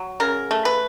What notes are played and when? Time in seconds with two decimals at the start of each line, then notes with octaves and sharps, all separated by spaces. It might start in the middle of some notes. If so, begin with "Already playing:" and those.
Already playing: F#3
0.20 C#3 A#4
0.51 A3
0.65 B4